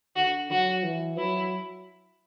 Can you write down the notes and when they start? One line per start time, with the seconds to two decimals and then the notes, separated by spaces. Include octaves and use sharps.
0.16 D3 F#4
0.51 F#3 F#4
0.83 E3
1.17 F#3 E4